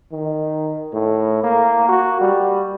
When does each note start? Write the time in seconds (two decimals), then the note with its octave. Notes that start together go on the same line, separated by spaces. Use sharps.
0.12 D#3
0.93 A2
1.43 A#3
1.89 F#4
2.21 G3